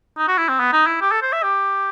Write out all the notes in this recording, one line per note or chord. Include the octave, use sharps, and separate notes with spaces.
D#4
F#4
E4
C4
B3
D#4
E4
G4
A4
C5
E5
G4